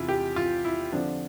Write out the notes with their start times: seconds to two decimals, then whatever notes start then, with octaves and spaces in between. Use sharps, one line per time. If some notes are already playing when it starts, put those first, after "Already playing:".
Already playing: E2 C3 E4 F4
0.09 G4
0.36 F4
0.65 E4
0.92 D3 F3 C4 D4